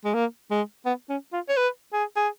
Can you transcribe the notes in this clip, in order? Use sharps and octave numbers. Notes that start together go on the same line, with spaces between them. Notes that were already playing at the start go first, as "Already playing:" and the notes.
G#3
A#3
G#3
B3
C#4
F4
C#5
B4
G#4
G#4